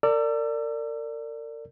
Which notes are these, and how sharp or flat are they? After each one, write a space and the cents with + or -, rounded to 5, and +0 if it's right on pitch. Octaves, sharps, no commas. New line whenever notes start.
A#4 -40 D5 +0 E6 +35